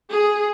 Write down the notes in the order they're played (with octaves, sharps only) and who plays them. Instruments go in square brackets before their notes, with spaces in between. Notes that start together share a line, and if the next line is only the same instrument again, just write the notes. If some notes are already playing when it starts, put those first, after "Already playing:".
[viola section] G#4